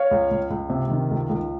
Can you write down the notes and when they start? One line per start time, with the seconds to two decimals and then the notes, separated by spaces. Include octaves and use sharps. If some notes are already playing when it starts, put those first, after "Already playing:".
Already playing: C#5 F5
0.11 C#2
0.31 C#2
0.50 C#2
0.70 C3
0.90 D#3
1.10 C#2
1.29 C#2